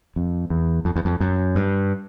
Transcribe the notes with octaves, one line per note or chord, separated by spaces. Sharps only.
F2
E2
F2
E2
F2
F#2
G2